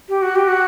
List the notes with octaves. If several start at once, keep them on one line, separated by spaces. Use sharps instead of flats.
G4
F#4
G4
F#4